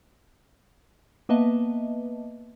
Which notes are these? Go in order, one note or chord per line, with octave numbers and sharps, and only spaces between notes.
A#3 B3 B4 D#5 E5 A5